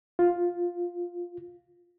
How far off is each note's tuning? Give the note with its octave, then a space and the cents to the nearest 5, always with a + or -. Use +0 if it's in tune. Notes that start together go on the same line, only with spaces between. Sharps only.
F4 +5